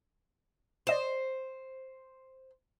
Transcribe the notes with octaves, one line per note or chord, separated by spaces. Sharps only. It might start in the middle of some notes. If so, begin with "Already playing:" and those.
C5 D5 D#5 E7